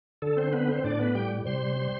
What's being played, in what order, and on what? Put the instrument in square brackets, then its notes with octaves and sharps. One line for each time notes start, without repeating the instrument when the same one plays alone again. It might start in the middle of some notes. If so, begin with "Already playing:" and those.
[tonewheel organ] D3 A4
C4 C5
B3 C4 B4
C4 C5
A2 D4 D5
B3 B4
G3 G4 G5
C3 C5 C6
G3